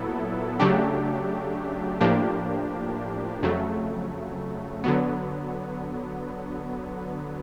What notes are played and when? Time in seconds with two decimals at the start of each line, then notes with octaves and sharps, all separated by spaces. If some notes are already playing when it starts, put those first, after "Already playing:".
Already playing: A#2 F#3 B3 E4 A4
0.60 C#3 F#3 A3 D4 G4
2.01 A2 F3 A#3 D4 G4
3.43 F2 C#3 F#3 A3
4.84 D3 F#3 B3